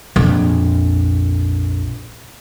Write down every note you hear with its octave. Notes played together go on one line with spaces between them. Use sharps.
A#1 F2